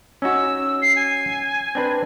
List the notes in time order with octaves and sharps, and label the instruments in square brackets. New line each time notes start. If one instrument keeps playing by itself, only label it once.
[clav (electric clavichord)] C#4 D#4 F#4 [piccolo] E6
[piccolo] C7
G#5
[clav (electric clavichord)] C4 D4 B4